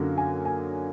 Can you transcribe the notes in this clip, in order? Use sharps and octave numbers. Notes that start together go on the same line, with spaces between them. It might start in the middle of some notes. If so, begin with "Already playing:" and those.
Already playing: F#2 D3 F#3 A#3 D#4
G#5
G#5